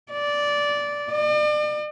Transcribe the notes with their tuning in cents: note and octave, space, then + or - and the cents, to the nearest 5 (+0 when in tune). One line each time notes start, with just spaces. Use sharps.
D5 -10
D5 +40